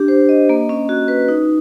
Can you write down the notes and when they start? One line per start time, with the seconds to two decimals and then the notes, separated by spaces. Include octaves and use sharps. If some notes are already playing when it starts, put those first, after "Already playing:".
Already playing: D4 G4
0.08 C5
0.29 D#5
0.49 A#3
0.69 C#4
0.89 F#4
1.08 B4
1.28 D#4